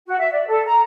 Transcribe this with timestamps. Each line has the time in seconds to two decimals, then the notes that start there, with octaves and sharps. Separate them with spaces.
0.06 F#4
0.19 E5
0.32 D5
0.48 A4
0.66 A#5